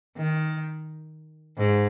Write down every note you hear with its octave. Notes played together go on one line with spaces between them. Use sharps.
D#3
G#2